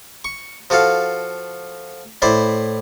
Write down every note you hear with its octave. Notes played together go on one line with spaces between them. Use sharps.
C#6
F3 F#4 A4 F5
A2 E4 C5 D5